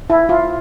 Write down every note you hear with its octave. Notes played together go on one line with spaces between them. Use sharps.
E4
F4